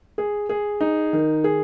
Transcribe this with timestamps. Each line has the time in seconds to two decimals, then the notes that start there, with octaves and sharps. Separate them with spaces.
0.18 G#4
0.49 G#4
0.81 D#4
1.13 D#3
1.44 G#4